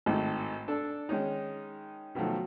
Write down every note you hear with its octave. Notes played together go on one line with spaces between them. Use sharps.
G#1 A2 D#3 A3
D4 A4
D#3 G#3 C#4 D#4
B2 D#3 F3 F#3 A3